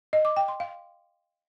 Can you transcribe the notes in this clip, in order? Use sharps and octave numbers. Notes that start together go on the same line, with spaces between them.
D#5
D6
G5
C6
F5